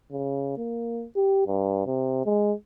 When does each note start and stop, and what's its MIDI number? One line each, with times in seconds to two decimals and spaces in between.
0.12 0.53 49
0.57 1.05 58
1.16 1.45 67
1.47 1.85 43
1.86 2.22 48
2.26 2.53 56